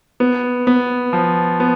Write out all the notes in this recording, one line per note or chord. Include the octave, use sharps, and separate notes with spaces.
B3
B3
F3
B3